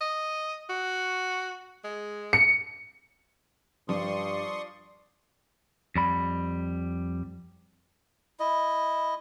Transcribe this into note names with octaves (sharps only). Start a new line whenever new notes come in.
D#5
F#4
G#3
C#7
G2 F3 D5 C6 C#6 D#6
F2 G3 B5
E4 D#5